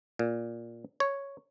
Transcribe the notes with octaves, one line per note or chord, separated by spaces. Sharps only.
A#2
C#5